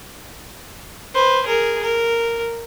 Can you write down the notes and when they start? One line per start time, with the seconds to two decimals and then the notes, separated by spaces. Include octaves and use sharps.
1.14 B4 C5
1.46 G#4 A#4
1.82 A#4